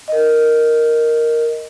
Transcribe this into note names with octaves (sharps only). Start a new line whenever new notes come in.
A#4 D#5